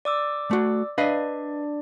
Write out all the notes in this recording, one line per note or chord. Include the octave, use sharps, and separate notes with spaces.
D5 D6 E6
A3 F#4
D4 B4 D5 D#5 F5